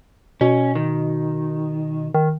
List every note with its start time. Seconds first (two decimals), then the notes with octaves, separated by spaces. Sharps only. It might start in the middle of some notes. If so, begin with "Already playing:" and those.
0.41 B2 C#4
0.75 D#3
2.15 D#3